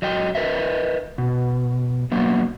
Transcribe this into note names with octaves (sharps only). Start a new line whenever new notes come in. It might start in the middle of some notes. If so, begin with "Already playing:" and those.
F#3 D#5 G5
A#4 B4 D#5 E5
B2
F#3 A#3 B3